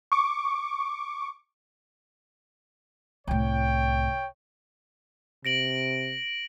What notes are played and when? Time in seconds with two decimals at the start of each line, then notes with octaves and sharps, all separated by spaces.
0.12 C#6 D6
3.27 C2 A2 C#5 G5
5.45 C3 A#6 D7 F#7